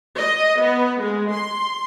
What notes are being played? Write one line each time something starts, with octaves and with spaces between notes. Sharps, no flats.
D#5
B3
G#3
C6